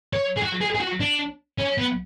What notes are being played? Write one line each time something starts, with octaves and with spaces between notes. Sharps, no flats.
C#5
G#4
F#4
G#4
G#4
F#4
D4
C#4
B3